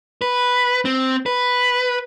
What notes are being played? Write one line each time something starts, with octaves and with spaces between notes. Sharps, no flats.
B4
C4
B4